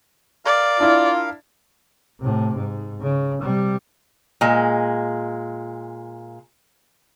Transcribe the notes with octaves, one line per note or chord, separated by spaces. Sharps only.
A#4 D5 F5
D4 E4 F4
A2 C3
G#2
C#3
C3 G3
A#2 G#3